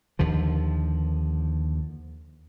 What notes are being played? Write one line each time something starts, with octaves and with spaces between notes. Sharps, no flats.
D#2 D3 F3